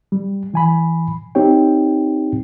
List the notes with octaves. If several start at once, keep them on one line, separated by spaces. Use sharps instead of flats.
G3
E3 G#5 B5
C4 D#4 G4 C#5 G5